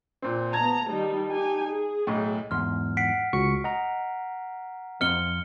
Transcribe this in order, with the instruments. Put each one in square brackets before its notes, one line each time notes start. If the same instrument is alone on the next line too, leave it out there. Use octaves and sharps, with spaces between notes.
[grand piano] A#2 C4
[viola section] B3 A#5 [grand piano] A5 G#6
[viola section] D#3 G3 D#4
D#4 G4 G#5
G#4
[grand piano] B1 A2
[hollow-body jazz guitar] E2 G#2 C6 [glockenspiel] F6
[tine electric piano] F#5 [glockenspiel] B6 C7 D7
[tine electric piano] C#2 C#6 C#7 [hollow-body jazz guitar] F#4
[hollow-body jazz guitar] D#5 [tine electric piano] F#5 A#5
[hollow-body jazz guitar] F2 C4 D#5 [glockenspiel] F6 C#7 G7